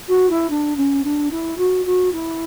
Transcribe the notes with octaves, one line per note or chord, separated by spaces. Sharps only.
F#4
E4
D4
C#4
D4
E4
F#4
F#4
E4